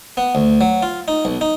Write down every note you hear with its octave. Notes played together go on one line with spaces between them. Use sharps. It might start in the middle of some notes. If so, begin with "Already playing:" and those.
B3
D2
F#3
F4
D#4
B1
D#4